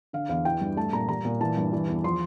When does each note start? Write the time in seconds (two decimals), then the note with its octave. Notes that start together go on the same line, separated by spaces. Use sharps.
0.13 D3 F5
0.29 E2 F5
0.45 E3 G5
0.61 G2
0.77 A3 A5
0.93 A#2 A#5
1.09 G3 A#5
1.25 A#2
1.41 E3 A5
1.57 G2
1.73 E3
1.88 E2
2.04 F3 C6